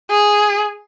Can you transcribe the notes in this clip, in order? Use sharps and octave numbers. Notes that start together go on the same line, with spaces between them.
G#4